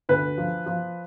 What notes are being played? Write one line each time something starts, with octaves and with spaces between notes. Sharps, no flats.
D2 B4
F3
F3